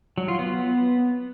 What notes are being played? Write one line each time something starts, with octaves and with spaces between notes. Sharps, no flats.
F#3
F4
B3